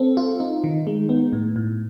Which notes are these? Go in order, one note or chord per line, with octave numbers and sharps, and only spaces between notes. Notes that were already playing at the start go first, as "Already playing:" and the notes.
Already playing: C4 A4
F4
D#4
D#3
G#3
B3
A2
A2